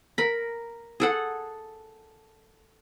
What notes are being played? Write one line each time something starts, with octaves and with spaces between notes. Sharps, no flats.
A#4 B5
G#4 A4 F#5